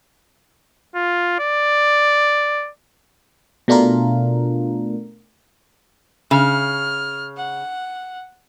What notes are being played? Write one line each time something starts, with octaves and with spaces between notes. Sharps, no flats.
F4
D5
B2 A3 D4 F4 A#4
C#3 F6
F#5